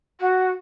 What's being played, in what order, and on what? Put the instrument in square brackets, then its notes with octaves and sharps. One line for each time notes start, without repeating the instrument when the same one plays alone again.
[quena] F#4